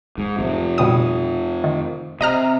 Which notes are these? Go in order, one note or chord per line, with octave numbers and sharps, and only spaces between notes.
G#2
F2 C3
B2 G3 D#6
D#3
C3 D#5 A#5 F6